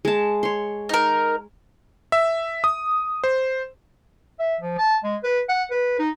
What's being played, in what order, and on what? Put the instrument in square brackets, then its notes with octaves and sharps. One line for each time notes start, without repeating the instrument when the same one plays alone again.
[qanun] G#3 A5
C#5 C6
[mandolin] D#4 A#4
[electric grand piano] E5
D#6
C5
[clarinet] E5
F3
A5
G#3
B4
F#5
B4
D#4